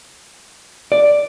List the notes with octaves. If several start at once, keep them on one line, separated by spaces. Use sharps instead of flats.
D5